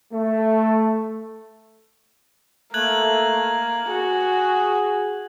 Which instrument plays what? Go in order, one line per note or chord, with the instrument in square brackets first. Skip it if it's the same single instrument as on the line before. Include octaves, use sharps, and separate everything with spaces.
[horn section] A3
[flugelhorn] A3 [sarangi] A#3 [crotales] F#6 G#6 F#7
[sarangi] F#4 [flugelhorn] G#4